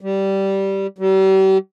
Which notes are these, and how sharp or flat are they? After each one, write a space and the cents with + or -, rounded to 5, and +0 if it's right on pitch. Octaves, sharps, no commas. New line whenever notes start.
G3 -10
G3 -40